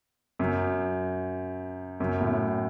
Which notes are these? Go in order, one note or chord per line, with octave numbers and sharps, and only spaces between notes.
F#2
F#2
A2